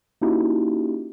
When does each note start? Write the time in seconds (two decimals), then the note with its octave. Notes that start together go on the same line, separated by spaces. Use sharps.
0.21 A#3 C#4 D#4 E4 F#4 G4